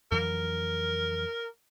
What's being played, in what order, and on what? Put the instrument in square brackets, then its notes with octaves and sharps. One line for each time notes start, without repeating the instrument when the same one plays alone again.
[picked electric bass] F2 E3 F#3 [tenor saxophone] A#4